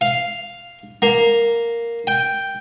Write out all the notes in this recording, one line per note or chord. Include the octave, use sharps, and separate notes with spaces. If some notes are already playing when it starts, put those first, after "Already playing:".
F5
A#3
G5